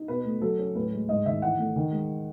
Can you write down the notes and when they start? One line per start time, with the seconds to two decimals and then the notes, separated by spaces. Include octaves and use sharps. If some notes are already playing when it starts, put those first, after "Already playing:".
Already playing: D#4
0.08 B2 B4
0.25 A3
0.42 F#3 A4
0.59 C#4
0.75 A2 B4
0.92 G#3
1.09 G#2 D#5
1.26 D#3 E5
1.42 E3 F#5
1.59 A3
1.76 D#3
1.92 G#3